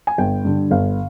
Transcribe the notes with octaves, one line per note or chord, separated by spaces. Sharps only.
G#5
G1 G5
G2 D3
G1 F5